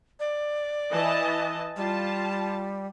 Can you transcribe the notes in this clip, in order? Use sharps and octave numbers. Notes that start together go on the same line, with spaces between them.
D5
E3 D#5 A5
G3 F4 A5